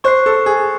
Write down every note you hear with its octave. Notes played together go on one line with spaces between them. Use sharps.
C5 C#6 F#6 C7
A4
G#4